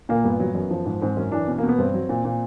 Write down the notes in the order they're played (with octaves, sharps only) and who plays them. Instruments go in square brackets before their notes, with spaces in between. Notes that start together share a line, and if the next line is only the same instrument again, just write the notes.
[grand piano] A#2 A#3
G2 B3
F#3
F#2
F3
G#2
G#2 C4
F#2 C#4
E3 D4
B2 C#4
B2 A#3
B3
G2 C4
F#3
A#2
A#2